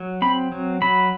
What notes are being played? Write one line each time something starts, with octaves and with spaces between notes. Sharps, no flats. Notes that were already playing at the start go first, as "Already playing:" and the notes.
Already playing: F#3
C4 B5
F#3
F#3 B5